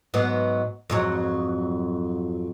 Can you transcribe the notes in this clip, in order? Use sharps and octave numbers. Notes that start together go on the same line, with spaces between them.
G#2 F#3 B3
F2 G#2 F#3